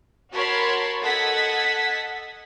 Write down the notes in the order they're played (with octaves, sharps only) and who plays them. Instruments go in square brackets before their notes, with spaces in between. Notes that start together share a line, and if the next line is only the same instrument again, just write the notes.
[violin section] F#4 A#4 C#5 A5 B5 C6
A4 D#5 F#5 G#6 A6 B6